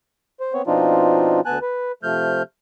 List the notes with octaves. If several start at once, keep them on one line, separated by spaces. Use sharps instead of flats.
C5
B3 C4 C#5
B2 F3 C4 D4 D#4 F4
D2 B3 G#5 A5 F#6
B4
C3 F3 A3 F6 G6